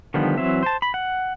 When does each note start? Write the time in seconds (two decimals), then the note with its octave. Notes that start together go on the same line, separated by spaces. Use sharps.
0.14 D3 D#3 F3 G3 B3
0.38 E3 F#3 C4 E5
0.63 C5 A5
0.82 B5
0.94 F#5